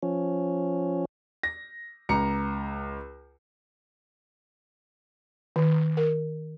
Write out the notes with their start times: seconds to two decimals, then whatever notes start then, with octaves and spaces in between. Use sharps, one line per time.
0.03 F3 C#4
1.43 A#6
2.09 C#2 A#5 C#7
5.56 D#3
5.97 A#4